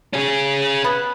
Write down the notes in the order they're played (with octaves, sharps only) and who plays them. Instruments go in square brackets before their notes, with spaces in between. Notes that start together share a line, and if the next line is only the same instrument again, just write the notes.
[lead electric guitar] C#4 G#4
[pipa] B3 B4